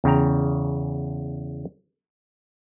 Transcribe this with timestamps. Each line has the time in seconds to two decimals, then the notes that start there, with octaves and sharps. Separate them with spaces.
0.04 E2 C#3 G5 A#5